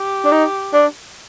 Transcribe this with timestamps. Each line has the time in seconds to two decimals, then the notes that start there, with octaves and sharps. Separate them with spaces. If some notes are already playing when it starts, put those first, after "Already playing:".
Already playing: G4
0.25 D4
0.32 D#4
0.74 D4